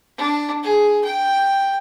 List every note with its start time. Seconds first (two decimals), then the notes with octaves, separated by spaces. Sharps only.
0.17 D4
0.63 G#4
1.04 G5